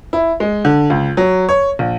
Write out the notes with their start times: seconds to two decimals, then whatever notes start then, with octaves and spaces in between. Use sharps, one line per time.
0.13 E4
0.40 G#3
0.65 D3
0.90 C#2
1.17 F#3
1.49 C#5
1.79 A#1